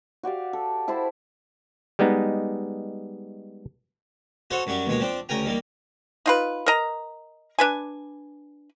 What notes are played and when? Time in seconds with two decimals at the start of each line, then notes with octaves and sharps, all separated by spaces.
0.23 F#4 G4 D5 F5
0.53 A4
0.88 E4 C5 A5 B5
1.99 G3 G#3 B3 D#4
4.51 F#4 A4 C5 C#5 F#5
4.67 F#2 F#3 G3 C#6
4.87 D#2 B2 G#3 C#5
5.00 F3 C4 D4
5.29 D2 C#3 A#4 G5 G#5 A#5
5.46 D#3 G3 A#3
6.26 D#4 F4 B4
6.66 A#4 D#5 A#5
7.59 D4 B4 G#5